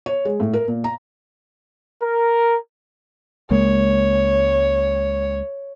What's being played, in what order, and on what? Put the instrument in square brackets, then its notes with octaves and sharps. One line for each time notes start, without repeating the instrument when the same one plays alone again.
[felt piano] C#5
G#3
A2
A#4
A#2
A#5
[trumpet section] A#4
[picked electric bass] C#2 G#3 A#3 [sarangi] C#5